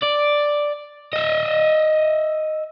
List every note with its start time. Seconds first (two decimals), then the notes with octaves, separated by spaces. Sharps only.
0.02 D5
1.13 D#5 E5